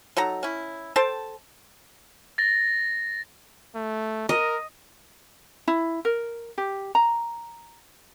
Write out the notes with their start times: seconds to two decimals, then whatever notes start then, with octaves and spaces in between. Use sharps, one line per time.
0.17 F#3 D#4 A4 A#5
0.43 C#4 E4
0.96 A4 C5 G5 A5
2.38 A6 A#6
3.75 A3
4.29 A#4 D#5
5.68 E4
6.05 A#4
6.58 G4
6.95 A#5